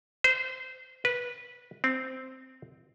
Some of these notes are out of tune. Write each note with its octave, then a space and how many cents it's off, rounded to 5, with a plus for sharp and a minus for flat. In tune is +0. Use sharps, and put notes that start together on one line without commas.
C5 -25
B4 -15
C4 -5